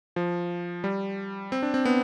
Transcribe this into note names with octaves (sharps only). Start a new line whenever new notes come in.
F3
G3
C4
D4
C4
B3